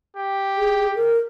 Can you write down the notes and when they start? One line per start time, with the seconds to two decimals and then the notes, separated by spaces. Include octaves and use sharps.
0.17 G4
0.57 G#4
0.95 A#4